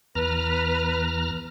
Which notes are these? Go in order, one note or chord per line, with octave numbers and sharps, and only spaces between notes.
E2 B4 A#5 F6